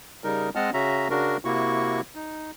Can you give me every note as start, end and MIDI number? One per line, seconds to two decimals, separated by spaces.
0.24 0.49 49
0.24 0.49 55
0.24 0.49 63
0.24 0.49 70
0.55 0.70 56
0.55 0.70 60
0.55 0.70 75
0.55 0.70 78
0.55 0.70 81
0.55 0.70 89
0.74 1.08 49
0.74 1.08 61
0.74 1.08 66
0.74 1.08 76
0.74 1.08 82
1.10 1.37 49
1.10 1.37 62
1.10 1.37 66
1.10 1.37 70
1.45 2.01 48
1.45 2.01 58
1.45 2.01 64
1.45 2.01 66
1.45 2.01 85
2.15 2.51 63